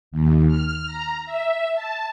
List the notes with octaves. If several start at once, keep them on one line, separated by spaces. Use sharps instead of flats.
D#2
F6
A#5
E5
A5